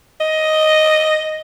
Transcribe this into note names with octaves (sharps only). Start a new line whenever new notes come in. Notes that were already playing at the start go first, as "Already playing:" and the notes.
D#5